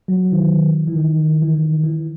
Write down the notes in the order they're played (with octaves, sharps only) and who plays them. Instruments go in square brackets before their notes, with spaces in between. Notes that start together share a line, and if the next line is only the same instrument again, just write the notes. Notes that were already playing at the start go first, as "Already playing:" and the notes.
[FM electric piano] F#3
D#3
E3
E3
D#3
E3
D#3
E3